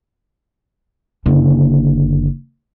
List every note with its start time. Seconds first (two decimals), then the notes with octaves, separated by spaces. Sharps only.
1.26 F#1 D3